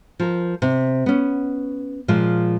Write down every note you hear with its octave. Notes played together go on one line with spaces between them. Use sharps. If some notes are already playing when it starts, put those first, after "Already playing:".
F3 A#4
C3
B3 C#4
A#2 F3 G#3